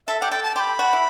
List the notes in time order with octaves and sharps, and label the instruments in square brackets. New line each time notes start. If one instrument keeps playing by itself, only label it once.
[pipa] A4 [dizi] E5
[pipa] G4 [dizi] F#5
[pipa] A4 [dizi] G5
[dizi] A5
[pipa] G4 [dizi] C6
[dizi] B5
[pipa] F#4
E4